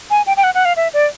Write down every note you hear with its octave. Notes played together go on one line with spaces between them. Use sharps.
G#5
G5
G5
F#5
F#5
F5
E5
D5